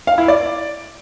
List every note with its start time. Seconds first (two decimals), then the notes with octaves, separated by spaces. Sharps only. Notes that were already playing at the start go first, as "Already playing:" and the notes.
0.07 F5
0.18 E4
0.28 D5